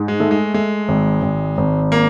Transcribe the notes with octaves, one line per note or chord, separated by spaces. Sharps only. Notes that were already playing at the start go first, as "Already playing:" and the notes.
Already playing: G#2
G#3
A3
G#3
G#3 A3
G#1
G#1
G#1
A#3